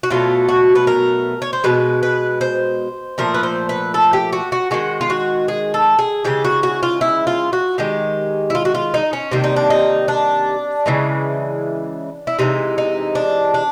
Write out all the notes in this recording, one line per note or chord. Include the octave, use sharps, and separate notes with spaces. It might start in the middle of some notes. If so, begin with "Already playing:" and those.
F#4
B2 F#3 A3 F4
F#4
B4
A#4
C#5
C5
B2 G#3 B4
B4
C5
A#2 F3 A3 A#4
B4
C5
B4
A4
G4
F#4
F#4
D#3 G#3 F#4
F4
F#4
G#4
A4
G#4
C#3 E3 G#3 G4
F#4
F#4
F4
E4
F4
F#4
D#3 G#3 G4
E4
F4
F#4
F4
D#4
C#4
C3 D#3 G3 A#3 D4
D#4
D4
D#4
D4
C#3 E3 G#3
E4
C3 E3 G#3 D#4
D#4
D4
D4